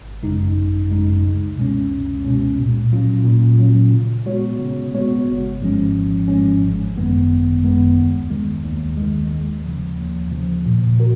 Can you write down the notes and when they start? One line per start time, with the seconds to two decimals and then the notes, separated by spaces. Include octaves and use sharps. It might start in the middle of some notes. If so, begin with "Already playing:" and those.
Already playing: G#1
0.23 F#2 C#3 G#3 D#4
0.55 G#1
0.90 F#2 C#3 G#3 D#4
1.23 C#2
1.57 B2 G#3 C#4
1.90 C#2
2.25 B2 G#3 C#4
2.57 A#2
2.92 F#3 C#4 F4
3.25 A#2
3.58 F#3 C#4 F4
3.92 C#3
4.26 G#3 B3 F#4 C#5
4.59 C#3
4.94 G#3 B3 F#4 C#5
5.27 G#1
5.61 G#2 F3 G#3 C#4
5.94 G#1
6.28 G#2 F3 G#3 C#4
6.61 G#1
6.95 F#2 D#3 G#3 B3
7.30 G#1
7.62 F#2 D#3 G#3 B3
7.96 D#2
8.30 D#3 G#3
8.64 D#2
8.97 D#3 G#3
9.31 D#2
9.65 C#3 F3
9.98 D#2
10.31 C#3 F3
10.65 A#2
11.00 F#4 A#4